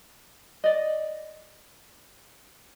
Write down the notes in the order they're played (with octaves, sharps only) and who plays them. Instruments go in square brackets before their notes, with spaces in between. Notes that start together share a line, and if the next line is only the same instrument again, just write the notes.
[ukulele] D5 D#5